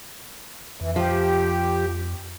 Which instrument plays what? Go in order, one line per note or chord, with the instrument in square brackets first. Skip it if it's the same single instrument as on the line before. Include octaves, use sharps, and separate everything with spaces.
[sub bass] F2 [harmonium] E3
[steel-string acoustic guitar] F3 [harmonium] G4